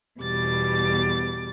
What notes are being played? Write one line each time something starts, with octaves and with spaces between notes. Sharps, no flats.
E2 B2 G3 D6 A6